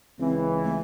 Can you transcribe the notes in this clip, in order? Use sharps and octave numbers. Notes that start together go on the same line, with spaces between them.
C#2 C#3 E3 C4
A3